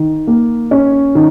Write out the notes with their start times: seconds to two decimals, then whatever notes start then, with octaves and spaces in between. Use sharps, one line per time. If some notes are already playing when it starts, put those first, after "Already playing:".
Already playing: D#3
0.27 A#3
0.71 C#4
1.15 D#3